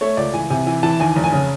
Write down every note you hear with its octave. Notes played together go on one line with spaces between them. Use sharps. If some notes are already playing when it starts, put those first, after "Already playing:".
A3 C#5
C#2 D5
E3 G#5
C3 G#5
E3 G#5
E3 A5
D#2 G#5
F1
G#5
C#3